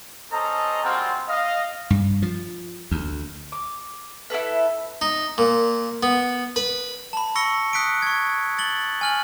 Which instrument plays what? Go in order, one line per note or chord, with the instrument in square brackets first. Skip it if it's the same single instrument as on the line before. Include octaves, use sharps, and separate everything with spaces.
[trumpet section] C#4 A4 C5 D#5 A#5
G3 G#3 A#3 C4 F4 F#4
D#5 F5
[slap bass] G2
F3
D2
[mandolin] D6
E4 G#4 A4 B4
[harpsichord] D#4
A#2
B3
B4
[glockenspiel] A5 B5
B5 C#6 E6 A#6 C#7 G7
D#6 F#6 B6 C#7 D7
C#6 G#6
A6 F#7 G7
G#5 F6 F#7